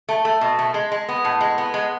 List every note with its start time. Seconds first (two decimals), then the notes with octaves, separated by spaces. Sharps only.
0.09 A3
0.25 A3
0.41 B2
0.59 A3
0.74 G#3
0.92 G#3
1.09 B3
1.25 A2
1.41 G#3
1.58 B3
1.74 G#3